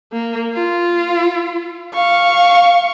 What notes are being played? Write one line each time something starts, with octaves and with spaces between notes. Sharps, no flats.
A#3
F4
F5 C#6